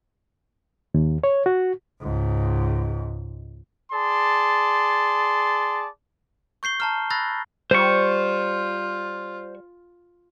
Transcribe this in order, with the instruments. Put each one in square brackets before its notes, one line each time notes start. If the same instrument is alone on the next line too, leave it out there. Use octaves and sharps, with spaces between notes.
[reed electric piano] D#2
C#5
F#4
[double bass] C#2 G#2
[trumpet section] G#4 D5 A5 C6
[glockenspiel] C#6 G6 C7 G7
A5 A#5 F6
B5 E6 F#6 A6 A#6
[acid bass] G3 [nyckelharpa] F4 [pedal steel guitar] C5 C#6